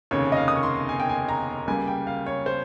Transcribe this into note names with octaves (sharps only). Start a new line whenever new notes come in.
F1 D#2 C#3 C#5
D#5
F5
D#6
C#6
C6
G#5
G5
G#5
A#5
C#2 C#3 G3 A#3 G#5
G5
F5
C#5
C5